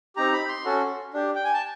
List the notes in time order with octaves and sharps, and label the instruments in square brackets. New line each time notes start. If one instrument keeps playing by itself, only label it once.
[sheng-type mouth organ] C4 D#4 G4 A#5
B5
C6
C#4 F#4 A4
D4 G4
G5
G#5
A5